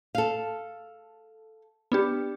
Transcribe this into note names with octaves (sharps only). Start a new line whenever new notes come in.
A4 F5
B3 D4 G4